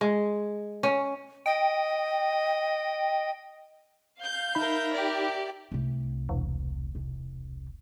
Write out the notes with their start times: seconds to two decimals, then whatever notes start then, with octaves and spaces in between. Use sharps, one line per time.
0.01 G#3
0.83 C#4
1.46 D#5 G5
4.17 F5 G6
4.55 D#4 A#4 E5 B5
4.92 G4 D5
5.72 C2 A3
6.29 E1
6.95 C2